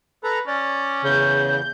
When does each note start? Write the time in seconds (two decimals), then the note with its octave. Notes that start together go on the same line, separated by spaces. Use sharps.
0.24 A4 B4 A#5
0.47 C#4 D5
1.04 E2 C#3 G6